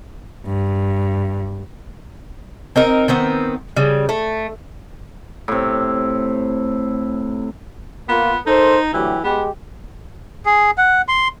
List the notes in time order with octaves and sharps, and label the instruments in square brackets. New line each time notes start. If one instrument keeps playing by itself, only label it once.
[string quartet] G2
[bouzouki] C4 D#4 A#4
D#3 B3 C4
C#3 G3
A3
[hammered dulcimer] A2 C3
[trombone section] A#3 F4 [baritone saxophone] B3
[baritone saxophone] D#4 [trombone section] A4 A#4 C5
[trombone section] D2 F#3 G4 [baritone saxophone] E3
[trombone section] G#3 G4 [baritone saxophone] B3
[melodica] G#4
F#5
C6